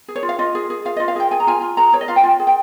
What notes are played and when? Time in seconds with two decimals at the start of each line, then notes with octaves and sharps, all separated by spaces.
0.08 G#4
0.16 C#5
0.23 F4
0.29 F5
0.39 F4 D#5
0.55 G#4
0.70 G#4
0.85 F4 F5
0.97 D#5
1.00 F4
1.08 F5
1.16 G#4 G5
1.31 G#4 G#5
1.40 A#5
1.47 F4 G#5
1.62 F4
1.77 G#4 A#5
1.93 G#4 C#5
2.01 D#5
2.08 F4 F5
2.16 G5
2.23 F4 G#5
2.39 G#4
2.47 G5